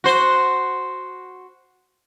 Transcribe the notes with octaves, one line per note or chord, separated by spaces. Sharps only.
F#4 C5